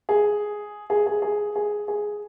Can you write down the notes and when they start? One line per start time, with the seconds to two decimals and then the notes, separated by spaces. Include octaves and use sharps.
0.09 G#4
0.90 G#4
1.06 G#4
1.22 G#4
1.56 G#4
1.88 G#4